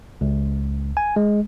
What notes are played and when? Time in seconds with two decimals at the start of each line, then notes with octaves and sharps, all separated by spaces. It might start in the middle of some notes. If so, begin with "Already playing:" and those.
0.21 C#2
0.97 G#5
1.16 G#3